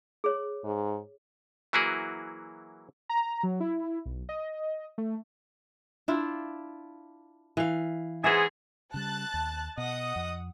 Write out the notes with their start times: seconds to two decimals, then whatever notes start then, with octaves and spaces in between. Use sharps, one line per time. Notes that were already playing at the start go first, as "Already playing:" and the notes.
0.24 G#4 C#5
0.64 G#2
1.73 E3 F#3 A#3 E4 F#4 G#4
3.09 A#5
3.43 F#3
3.60 E4
4.06 B1
4.29 D#5
4.98 A3
6.08 D4 E4 F4
7.57 E3 F5
8.24 G#2 B3 G#4 C5 E5
8.94 C#3 G3 A5 F#6 A6
9.34 D#2
9.77 B2 D#5 F#5 D#6
10.16 F2